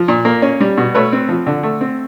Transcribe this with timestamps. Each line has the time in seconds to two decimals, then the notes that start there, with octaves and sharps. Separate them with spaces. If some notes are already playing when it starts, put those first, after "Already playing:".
Already playing: F3
0.08 A#2
0.25 A#3
0.42 C#4
0.61 G3
0.77 B2
0.95 A3 B4 C#5
1.13 C4
1.29 F3
1.47 D3
1.63 A3
1.81 C4